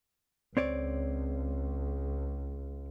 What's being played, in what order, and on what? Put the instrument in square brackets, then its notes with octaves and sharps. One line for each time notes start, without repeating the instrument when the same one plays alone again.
[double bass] C#2 [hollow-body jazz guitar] C4 C#5 D5